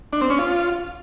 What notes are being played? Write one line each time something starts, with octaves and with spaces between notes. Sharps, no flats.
D4
C4
C#4
F4